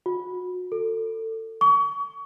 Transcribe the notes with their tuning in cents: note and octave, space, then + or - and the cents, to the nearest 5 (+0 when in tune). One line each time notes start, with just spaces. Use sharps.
F#4 -30
A4 +25
C#6 +35